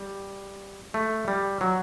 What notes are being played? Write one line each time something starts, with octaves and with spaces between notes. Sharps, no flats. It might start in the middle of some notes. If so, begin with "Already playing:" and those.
Already playing: G3
A3
G3
F#3